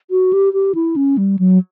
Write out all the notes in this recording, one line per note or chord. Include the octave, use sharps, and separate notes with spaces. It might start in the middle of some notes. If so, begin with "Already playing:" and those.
F#4
G4
G4
E4
C#4
G3
F#3